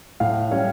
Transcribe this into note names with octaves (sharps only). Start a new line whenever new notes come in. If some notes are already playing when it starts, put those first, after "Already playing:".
A2 F5
G3 C#4 C#5